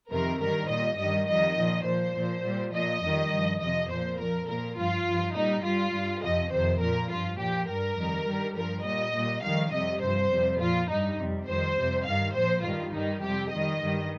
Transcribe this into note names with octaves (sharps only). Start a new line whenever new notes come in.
F2 C3 D#3 A#4
G2 D#3 G3 A#4
A#2 G3 D#5
G2 D#3 G3 D#5
F2 D#3 G3 D#5
A#2 F3
A#2 F3 C5
A#2 F3
A#2 G3
A#2 F3 D#5
F2 D#3 G3
G2 F3
F2 C3 F3 D#5
A#2 F3 C5
F2 F3 A#4
A#2 F3 A#4
G2 F3 F4
G2 F3
A#2 G3 D#4
G2 G3 F4
G2 G3
F2 C3 F3 D#5
F2 C3 D#3 C5
A#2 F3 A#4
G2 F3 F4
A#2 F3 G4
G2 G3 A#4
F2 D#3 G3
G2 D#3 G3
G2 F3 A#4
A#2 G3 D#5
A#2 G3
F2 D#3 G3 F5
F2 C3 G3 D#5
G2 F3 C5
F2 C3 G3
A#2 F3 F4
G2 G3 D#4
F2 C3 G3
F2 D#3 G3 C5
F2 C3 G3
G2 D#3 G3 F5
A#2 F3 C5
G2 D#3 G3 F4
G2 D#3 G3 D#4
F2 C3 G3 G4
F2 D#3 G3 D#5
G2 D#3 G3